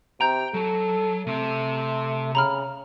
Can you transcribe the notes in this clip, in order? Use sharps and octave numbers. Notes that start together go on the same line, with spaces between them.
C3 G5 A#5 G6
F#3 A4
C3 A3 C4
C#3 A#5 B5 F6